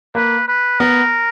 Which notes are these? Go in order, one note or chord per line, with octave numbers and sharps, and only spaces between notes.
A#3 B4
B4
B3 A#4